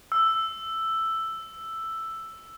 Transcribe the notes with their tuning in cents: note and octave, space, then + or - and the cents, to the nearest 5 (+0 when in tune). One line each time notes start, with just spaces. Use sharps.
E6 +5